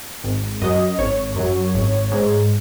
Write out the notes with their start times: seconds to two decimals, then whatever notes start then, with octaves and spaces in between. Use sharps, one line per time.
0.24 G#1
0.62 F#2 F#3 D#5
0.98 G#1 C#5
1.36 F#2 F#3
1.74 G#1
2.12 G#2 G#3